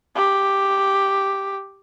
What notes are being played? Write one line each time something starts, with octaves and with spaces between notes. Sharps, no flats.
G4